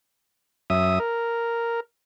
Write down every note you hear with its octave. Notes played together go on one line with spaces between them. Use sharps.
F#2 E5 D#6
A#4